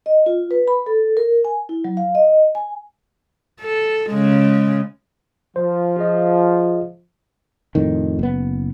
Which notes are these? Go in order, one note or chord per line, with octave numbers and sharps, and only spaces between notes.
D#5
F4
B4
B5
A4
A#4
G#5
E4
F#3
F5
D#5
G#5
A4
C#3 G#3
F3 C5
F4 G#4 D#5
F2 A2 D#3
F#1 B3